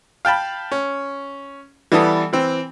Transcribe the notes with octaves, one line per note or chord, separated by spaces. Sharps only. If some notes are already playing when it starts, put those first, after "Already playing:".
F5 G5 A5 B5
C#4
E3 G3 B3 E4 A4 D#6
E3 C4